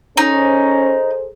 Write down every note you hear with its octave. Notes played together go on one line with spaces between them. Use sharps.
C#4 D#4 G#4 A4 C5